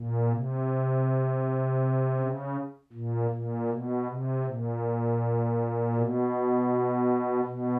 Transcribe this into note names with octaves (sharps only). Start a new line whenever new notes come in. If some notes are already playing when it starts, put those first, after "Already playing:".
Already playing: A#2
C3
C#3
A#2
A#2
B2
C3
A#2
B2
B2